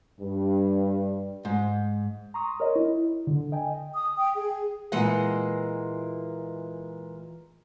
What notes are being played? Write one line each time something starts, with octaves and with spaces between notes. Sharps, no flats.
G2
G#2
A#5 C6 C#6 D#6
A#4 C#5 D#5
E4
D3
D#5 G5 G#5
D#6
G5
G#4
A#2 E3 G#3 D#5 F#5